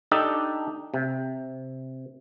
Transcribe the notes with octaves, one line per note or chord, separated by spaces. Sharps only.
D4 D#4 G4 A4
C3